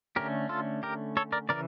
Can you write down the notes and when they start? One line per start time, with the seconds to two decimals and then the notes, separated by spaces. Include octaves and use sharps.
0.16 D3 A3 C#4 G4 A#4
0.49 F4 A4
0.83 G4 A#4
1.17 A4 C#5
1.32 A#4 D5
1.49 C#3 E3 A#4 D5